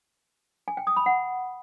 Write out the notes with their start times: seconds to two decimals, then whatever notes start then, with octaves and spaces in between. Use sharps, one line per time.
0.68 G#5
0.77 G5
0.87 D#6
0.96 B5
1.06 F#5